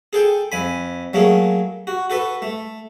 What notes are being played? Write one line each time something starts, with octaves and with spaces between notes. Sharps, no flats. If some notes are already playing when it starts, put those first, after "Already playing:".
G#4 A4 G5
F2 G#5 B5
F#3 A3 A#3 G#4
F#4
F#4 A4 B4
A3